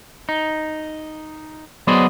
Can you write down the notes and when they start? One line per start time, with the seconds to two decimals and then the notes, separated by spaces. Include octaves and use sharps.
0.29 D#4
1.87 F#3 B3 G#4 C5 D5 D#5